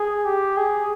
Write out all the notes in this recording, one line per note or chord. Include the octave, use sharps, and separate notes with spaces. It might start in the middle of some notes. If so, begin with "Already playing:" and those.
Already playing: G#4
G4
G#4